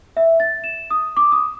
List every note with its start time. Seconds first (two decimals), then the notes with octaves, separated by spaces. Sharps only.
0.17 E5
0.40 A6
0.64 E7
0.91 D#6
1.17 D6
1.32 D#6